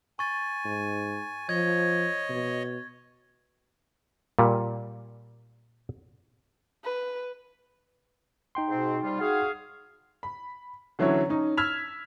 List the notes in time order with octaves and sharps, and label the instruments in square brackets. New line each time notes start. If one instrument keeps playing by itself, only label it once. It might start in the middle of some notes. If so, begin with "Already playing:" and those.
[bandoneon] G#5 [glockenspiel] C#6 A6
[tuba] G#2
[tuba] F3 [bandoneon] C#5 D#5 [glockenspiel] G#6
[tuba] B2
[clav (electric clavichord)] A#2 G3
[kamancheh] B4
[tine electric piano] D#4 G5 C6
[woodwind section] G#2 B2 C4
C3 G3 F4
F#4 G#4 F5
[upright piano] B5
D3 E3 F#3 C#4 E4 C#5
C#4 D#4
E6 F6 G#6 B6 F7